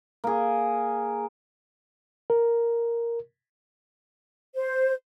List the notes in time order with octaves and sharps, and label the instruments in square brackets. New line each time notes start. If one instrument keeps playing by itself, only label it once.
[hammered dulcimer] A#3 G#4
[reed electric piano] A#4
[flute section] C5